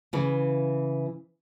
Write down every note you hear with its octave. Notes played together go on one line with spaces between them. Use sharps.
C#3 E3